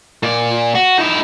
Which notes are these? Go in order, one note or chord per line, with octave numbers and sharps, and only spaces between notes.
A#2 D5
F#4
D#4 E4